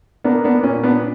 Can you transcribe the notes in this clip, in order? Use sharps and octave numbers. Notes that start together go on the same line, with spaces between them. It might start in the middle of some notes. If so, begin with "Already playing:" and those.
A#3 B3 D4
B3 D4
A#2 C#4
B3 D4